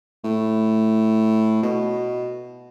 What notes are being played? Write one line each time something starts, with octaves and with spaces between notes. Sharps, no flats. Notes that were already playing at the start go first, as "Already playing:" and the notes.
A2
B2